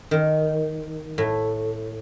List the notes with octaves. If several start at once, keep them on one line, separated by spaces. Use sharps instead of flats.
D#3
A2